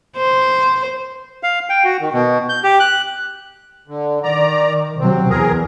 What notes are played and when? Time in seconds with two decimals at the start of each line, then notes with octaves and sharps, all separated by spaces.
0.17 C5
1.43 F5
1.69 G5
1.84 F#4
2.01 D#3
2.13 B2
2.49 G6
2.64 G4
2.80 F#6
3.88 D3
4.23 D#3 D5 A#5
5.00 C3 F#3 C4
5.30 E2 G#4 A#4